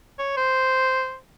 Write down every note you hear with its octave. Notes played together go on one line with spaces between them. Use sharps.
C#5
C5